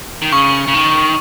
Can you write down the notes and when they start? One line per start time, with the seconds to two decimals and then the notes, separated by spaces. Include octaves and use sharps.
0.22 D#3
0.32 C#3 C#6
0.67 C#3
0.74 D#3